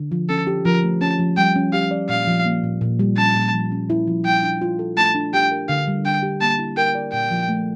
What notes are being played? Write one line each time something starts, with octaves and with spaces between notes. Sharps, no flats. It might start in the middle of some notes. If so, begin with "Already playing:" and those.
Already playing: D3
F3
C#4 A4
G4
F3 A#4
A3
C#4 A5
F3
G3 G5
C#4
G4 F5
D5
A#2 F5
F3
A#3
A#2
A#2
G3
C#4 A5
A#2
F3
C#4
E4
F3
G3 G5
D4
F4
A4
A3 A5
D4
G4 G5
A#4
D3 F5
G3
D4 G5
G4
A#3 A5
E4
A#4 G5
D5
A#2 G5
F3
A3